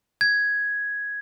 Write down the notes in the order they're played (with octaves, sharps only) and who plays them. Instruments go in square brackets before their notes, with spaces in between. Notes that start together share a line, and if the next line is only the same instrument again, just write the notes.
[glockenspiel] G#6